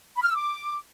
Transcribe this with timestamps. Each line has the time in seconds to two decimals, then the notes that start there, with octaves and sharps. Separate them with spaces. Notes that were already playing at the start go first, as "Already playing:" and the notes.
0.16 B5
0.23 F6
0.29 E6
0.36 D6